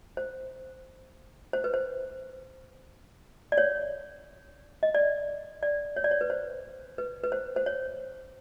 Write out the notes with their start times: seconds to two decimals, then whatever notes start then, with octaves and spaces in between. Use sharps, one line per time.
0.17 C5
1.53 C5
1.64 B4
1.74 C5
3.52 D5
3.58 C#5
4.83 D#5
4.95 D5
5.63 D5
5.96 C#5
6.04 D5
6.11 C#5
6.21 B4
6.30 C5
6.98 B4
7.24 B4
7.32 C5
7.56 C5
7.66 C#5